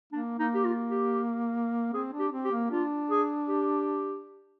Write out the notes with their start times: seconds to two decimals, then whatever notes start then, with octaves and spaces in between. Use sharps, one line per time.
0.13 A#3 D4
0.39 A#3 D#4
0.54 G4
0.65 F4
0.91 G4
1.93 C4 G#4
2.13 D4
2.19 G4
2.32 C4
2.45 G4
2.52 A#3
2.71 D4 F4
3.10 G#4
3.48 G4